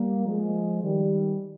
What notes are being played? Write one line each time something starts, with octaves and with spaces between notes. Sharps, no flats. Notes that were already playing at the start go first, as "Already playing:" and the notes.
Already playing: G3 A#3
F3 G#3
D#3 G3